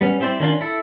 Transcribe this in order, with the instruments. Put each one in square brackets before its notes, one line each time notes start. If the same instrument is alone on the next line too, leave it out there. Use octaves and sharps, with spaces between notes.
[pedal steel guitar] G3 B3 C#4
G3 C4 E4 C5 D5
D#3 C#4 D4 F4
E4 A4